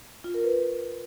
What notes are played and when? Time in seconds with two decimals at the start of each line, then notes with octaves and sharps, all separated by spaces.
0.24 F4
0.34 A#4
0.44 B4